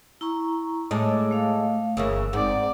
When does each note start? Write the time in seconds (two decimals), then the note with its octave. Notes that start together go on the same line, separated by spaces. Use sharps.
0.21 E4 A#5 C#6
0.91 A2 G#3 C#5 D#5 A5 D6
1.31 A3 F5
1.97 G1 C#3 E3 A#3 E6
2.33 G#2 C4 D5 F#5